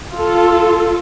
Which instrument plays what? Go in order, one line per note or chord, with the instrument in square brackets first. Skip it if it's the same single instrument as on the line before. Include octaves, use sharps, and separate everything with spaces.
[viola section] F4 A4